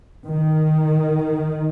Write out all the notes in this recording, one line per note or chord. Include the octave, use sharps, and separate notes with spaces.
D#3